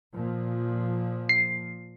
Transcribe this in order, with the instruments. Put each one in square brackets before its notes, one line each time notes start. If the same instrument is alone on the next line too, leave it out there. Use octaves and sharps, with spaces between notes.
[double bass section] A#2 F3
[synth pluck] C7